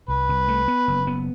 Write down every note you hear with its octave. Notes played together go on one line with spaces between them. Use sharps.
C2 B4
C2
A3
B3
F#1
B3